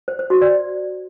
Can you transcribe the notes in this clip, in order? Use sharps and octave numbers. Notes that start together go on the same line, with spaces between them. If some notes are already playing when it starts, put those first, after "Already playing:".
C5
C5
F#4
D5